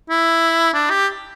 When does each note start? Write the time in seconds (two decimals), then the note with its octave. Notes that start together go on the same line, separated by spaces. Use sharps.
0.10 E4
0.74 D4
0.90 G4